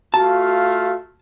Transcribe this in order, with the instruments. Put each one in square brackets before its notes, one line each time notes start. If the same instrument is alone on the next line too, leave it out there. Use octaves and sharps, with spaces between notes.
[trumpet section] A3 F4 F5 [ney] F#4 [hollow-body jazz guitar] A5